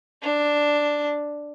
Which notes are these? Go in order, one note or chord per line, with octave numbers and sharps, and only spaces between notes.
D4